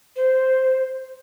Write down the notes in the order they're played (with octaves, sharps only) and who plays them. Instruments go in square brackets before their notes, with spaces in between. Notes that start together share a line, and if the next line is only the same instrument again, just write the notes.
[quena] C5